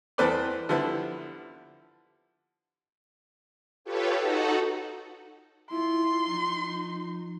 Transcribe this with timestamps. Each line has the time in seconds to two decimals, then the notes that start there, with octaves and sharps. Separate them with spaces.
0.18 E2 C4 A4 B4 C5 D5
0.69 D3 F3 G3 B3 E4
3.84 F4 G4 A4 B4 C#5
4.18 D#4 F#4 A4 F#5
5.71 E4 F4 C6
6.29 F3 D#4